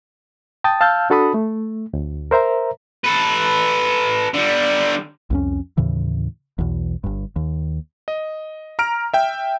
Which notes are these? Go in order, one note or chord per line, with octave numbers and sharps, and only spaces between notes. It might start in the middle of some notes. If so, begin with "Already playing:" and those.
G5 A5 D#6 A6
F5 A5 E6 F6 G6
D4 F#4 A4 A5 B5 D#6
A3
D2
A#4 C5 E5 A#5
A4 B4
D3 G3
C2 F2 C#4
D#2 A2 C#3 E3
B1 E2
G1 G2
D#2
D#5
A#5 F6 D7
E5 G5